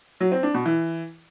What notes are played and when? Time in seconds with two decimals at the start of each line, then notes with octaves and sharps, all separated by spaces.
0.20 F#3
0.32 C4
0.43 D4
0.54 B2
0.66 E3